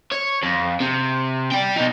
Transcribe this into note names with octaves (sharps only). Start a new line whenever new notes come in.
C#5
F2
C3
D5 G5
B2 D#4